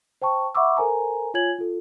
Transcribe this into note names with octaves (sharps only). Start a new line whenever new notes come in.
C5 G5 A5 C#6
E5 F#5 B5 C#6 D6 E6
A4 A#4 C5 G#5 A#5
F4 C#5 G#5 G#6 F#7
F4 A4